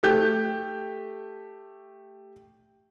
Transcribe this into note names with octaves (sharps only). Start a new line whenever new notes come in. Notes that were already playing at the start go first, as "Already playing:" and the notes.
A3 G4 G6